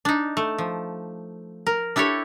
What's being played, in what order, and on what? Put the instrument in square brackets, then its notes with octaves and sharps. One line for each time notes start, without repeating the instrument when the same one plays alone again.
[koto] D4 D#4
A3
F3
A#4
D4 E4 G4 A4 C#5